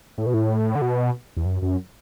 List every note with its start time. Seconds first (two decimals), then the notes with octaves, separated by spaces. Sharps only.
0.18 A2
0.26 B2
0.34 A2
0.75 D3
0.82 B2
1.37 E2
1.45 F#2
1.62 F#2